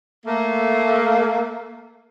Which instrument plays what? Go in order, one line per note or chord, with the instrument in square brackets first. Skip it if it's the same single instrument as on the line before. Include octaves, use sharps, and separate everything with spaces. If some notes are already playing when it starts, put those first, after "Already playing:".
[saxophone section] A3 A#3